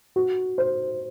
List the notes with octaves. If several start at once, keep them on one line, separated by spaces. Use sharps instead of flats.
F#4
C5